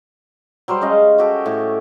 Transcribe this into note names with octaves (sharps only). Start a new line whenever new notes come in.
F#3 G3 F#4 C5
G#3 C#4 D#5 F5
F#4 G4 A4
A2